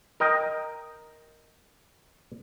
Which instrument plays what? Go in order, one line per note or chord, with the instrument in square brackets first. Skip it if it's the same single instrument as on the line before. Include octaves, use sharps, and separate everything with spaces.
[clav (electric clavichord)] A#4 D#5 G5